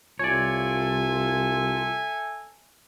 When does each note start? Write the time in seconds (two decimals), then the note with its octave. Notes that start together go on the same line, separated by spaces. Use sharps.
0.19 C2 F4 A4 C#5 D5 E5 G#5